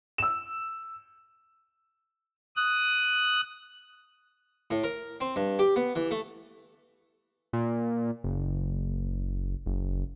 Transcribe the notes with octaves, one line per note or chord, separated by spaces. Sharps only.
E6 E7
D#6 F#6
A2
A#4
C4
G2
G4
B3
E3
A3
A#2
F#1
F#1